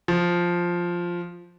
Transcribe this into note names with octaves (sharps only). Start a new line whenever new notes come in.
F3